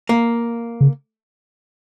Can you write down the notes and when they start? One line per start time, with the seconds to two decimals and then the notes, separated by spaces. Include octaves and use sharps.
0.09 A#3
0.81 C#3